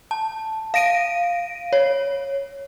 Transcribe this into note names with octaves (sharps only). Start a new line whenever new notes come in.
A5
F5 A#6 D7 D#7
C#5